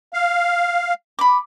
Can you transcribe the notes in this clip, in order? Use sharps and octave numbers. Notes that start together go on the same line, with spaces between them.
F5
B5 D6